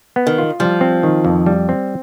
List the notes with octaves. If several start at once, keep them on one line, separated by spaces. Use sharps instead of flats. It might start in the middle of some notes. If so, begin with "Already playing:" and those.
B3
D#3
F4
F3 G3
C4
D#3
F2
G3
C4